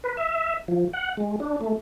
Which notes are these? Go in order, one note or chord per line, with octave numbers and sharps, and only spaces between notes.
B4
E5
F3
F#5
G#3
D4
A3